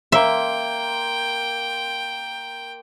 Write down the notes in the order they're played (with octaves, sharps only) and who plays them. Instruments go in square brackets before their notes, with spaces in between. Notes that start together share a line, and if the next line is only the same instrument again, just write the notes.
[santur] A#3 C6 [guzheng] E5 [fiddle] G5